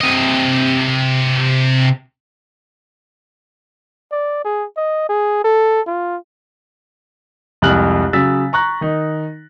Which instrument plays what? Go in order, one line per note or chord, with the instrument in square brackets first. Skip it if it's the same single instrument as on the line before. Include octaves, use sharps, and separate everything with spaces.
[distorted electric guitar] C3 D#5
[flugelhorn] D5
G#4
D#5
G#4
A4
F4
[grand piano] C2 F2 G#3 F6 F#6 F#7
C#3 F#3 E6 A6 B6
A#5 C#6 F#6 A#6
D#3 D#4